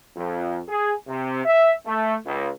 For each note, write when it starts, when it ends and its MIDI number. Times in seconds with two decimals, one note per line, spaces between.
0.16 0.59 41
0.68 0.94 68
1.08 1.41 48
1.45 1.73 76
1.86 2.15 57
2.26 2.50 37